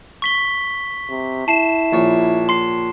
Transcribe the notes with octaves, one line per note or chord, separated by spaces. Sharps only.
C#6 B6 G7
C3
E4 A5 C7 E7
A#1 C#5
C6 C7